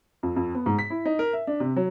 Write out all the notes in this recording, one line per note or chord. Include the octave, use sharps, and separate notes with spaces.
F2
F2
B3
G#2
B6
E4
D#4
A#4
E5
D4
C3
F#3